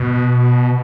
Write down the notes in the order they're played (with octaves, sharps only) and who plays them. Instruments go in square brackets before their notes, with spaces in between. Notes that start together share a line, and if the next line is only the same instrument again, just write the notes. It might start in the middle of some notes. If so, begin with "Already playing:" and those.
Already playing: [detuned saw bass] B2